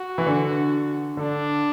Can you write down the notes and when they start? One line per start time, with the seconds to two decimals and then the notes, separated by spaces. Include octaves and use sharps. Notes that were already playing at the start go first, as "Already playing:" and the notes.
Already playing: F#4
0.18 E3
0.26 D3
1.17 D3 D4